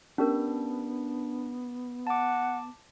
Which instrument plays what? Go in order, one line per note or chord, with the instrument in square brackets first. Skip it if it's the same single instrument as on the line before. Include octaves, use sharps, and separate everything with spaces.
[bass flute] B3 [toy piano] C#4 G4 A#4 [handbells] D4
[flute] F#5 [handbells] A5 D6